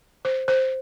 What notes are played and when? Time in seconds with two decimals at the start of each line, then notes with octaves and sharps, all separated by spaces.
0.25 C5
0.48 C5